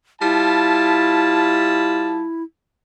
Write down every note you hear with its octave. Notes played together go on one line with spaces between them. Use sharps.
G3 E4 F4 A5